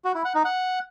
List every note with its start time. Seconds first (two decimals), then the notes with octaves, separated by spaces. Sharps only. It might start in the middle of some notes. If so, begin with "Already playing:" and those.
0.04 F#4
0.15 E4
0.25 F#5
0.35 D#4
0.45 F#5